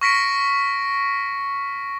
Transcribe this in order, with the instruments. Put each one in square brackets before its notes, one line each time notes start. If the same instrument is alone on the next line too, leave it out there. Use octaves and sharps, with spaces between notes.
[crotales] C#6 F6 A#6 B6 C#7 D7